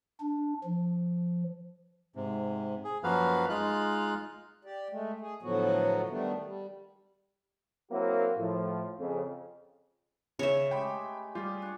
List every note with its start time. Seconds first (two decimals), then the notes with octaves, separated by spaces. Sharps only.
0.20 D4
0.64 F3
2.15 G#2 C3
2.84 G#4
3.04 F#2 F3 A#3 F#4 B4 F5
3.49 G#3 D#4 F4 F5 F#6
4.65 G4 D5
4.90 G#3 A3
5.21 G#4
5.42 A2 D3 F3 F#3 B3 F#4
6.09 D#3 G3 A3 B3 D4
6.44 G3
7.91 F#3 A#3 C4 E4 F#4 A#4
8.38 A2 F3
9.00 F2 C#3
10.39 C#3 C#5 E5 E7
10.71 G#3 A3 G4 G5 B5
11.35 G3 F4 G4 G#4
11.62 D4 C#6